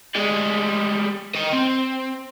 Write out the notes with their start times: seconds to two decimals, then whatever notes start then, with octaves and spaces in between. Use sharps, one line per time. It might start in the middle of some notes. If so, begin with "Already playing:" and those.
0.15 G3 G#3
1.35 D#5 G5
1.53 C4